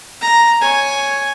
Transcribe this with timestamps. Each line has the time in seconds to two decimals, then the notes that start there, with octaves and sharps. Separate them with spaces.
0.21 A#5
0.61 C#5 G#5